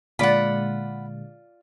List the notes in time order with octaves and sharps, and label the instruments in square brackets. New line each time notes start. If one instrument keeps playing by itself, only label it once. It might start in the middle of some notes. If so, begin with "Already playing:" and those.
[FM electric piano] A#2 D3 G#3 [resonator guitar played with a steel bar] F4 D5 [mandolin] F#5 B5